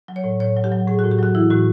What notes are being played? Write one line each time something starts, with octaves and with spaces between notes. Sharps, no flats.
F#3
C#5
A2
A2 C#5
F#3
G4
F#3
A2 G#4
F#4
A2
G4
F#3 F#4
E3 E4
A2 F#4